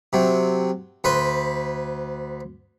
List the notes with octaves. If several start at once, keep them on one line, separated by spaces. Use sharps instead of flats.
C3 F#3
D2 B4 C5